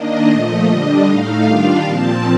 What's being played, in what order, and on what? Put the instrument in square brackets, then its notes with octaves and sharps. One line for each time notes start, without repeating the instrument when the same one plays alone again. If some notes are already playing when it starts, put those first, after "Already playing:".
Already playing: [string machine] D#3 A#3 D4 D#5
A#2 F3 A3
D3 G3 D4
A2 A3 D#4 F5
D#3 G3 D4 F4
A#2 F3 C4 A5